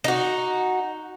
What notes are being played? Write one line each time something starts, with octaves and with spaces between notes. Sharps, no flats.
D#4 F#4